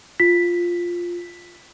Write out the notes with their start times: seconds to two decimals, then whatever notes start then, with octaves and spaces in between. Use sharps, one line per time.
0.20 F4 B6